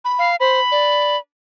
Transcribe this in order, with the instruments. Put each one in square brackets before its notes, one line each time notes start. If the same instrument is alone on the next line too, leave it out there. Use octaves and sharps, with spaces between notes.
[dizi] B5
[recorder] F5
[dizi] C5 [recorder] B5
[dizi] D5